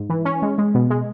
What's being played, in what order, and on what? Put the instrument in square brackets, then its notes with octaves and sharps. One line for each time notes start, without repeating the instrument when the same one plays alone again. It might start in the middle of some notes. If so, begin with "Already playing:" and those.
Already playing: [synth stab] G#2
E3
C#4
G#3
G#3
B2
G#3